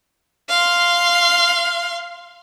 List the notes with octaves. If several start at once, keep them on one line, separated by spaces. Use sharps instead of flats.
F5 C6